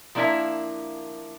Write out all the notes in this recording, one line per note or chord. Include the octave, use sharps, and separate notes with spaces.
F3 A#3 D4 E4 A#4 E5